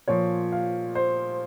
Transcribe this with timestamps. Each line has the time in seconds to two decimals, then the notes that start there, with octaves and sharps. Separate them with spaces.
0.08 A#2 F3 C#5
0.52 F5
0.95 C5